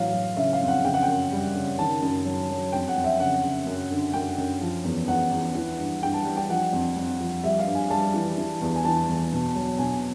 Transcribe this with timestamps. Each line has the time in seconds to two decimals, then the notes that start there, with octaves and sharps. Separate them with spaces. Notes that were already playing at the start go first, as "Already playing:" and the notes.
Already playing: A2 E3 F#3 F5
0.13 F#3
0.37 C#3 E5
0.53 F5
0.61 F2
0.68 F#5
0.84 C#3 G5
0.94 F#5
1.03 F#2 G5
1.32 G3
1.55 C#3
1.78 D#3 A5
2.02 F#2
2.25 F#3
2.50 F#3
2.72 F2 G5
2.88 F#5
2.96 F2
3.04 E5
3.20 C#3 F#5
3.43 C#3
3.67 F#2
3.90 D3
4.13 F#2 G5
4.38 F#2
4.61 F3
4.84 E2
5.08 E2 F#5
5.32 E2
5.55 E3
5.78 G2
6.02 G2 G5
6.14 A5
6.25 G3
6.37 G5
6.49 F3 F#5
6.73 F2
6.96 F2
7.20 F3
7.44 G3 E5
7.59 F5
7.66 G2
7.75 G#5
7.90 G3 A5
8.14 E3
8.38 E3
8.61 E2
8.76 G#5
8.85 E3 A5
9.09 E2
9.32 B2
9.55 F#3
9.79 B2 G#5